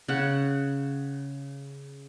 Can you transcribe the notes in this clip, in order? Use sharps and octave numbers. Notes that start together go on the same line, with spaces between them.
C#3 F#5